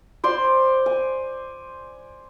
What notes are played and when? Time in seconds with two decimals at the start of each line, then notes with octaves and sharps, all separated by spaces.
0.24 C5 D5 C6
0.86 G#5